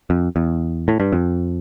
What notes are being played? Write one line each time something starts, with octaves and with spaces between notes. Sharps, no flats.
F2
E2
A2
G2
F2